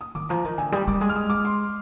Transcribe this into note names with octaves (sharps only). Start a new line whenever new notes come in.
D#6
D#3 D6
F3 A#5
D#3
D3 G#5
G3 D#6
G3 D6
G#3 D#6
F6
D#6
D6
C6